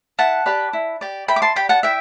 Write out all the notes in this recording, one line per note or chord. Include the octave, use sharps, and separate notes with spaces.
E4 F#5 A5
G4 B4 D5
E4
G4 D5
E4 G5 B5
D6
A5 C6
G4 D5 G5 B5
F#5 A5
E4 E5 G5